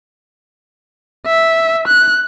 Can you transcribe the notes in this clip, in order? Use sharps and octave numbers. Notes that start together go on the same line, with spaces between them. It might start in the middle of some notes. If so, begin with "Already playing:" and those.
E5
F#6